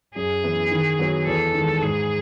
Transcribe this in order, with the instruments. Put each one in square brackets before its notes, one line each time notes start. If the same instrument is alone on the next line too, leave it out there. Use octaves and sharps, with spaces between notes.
[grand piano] F#2 [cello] G#4
[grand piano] E3 B3 E4
D#3
F#3 B3 F#4
[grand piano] E2 [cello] A4
[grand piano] D#3 G#3
[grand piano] G#2 [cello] G#4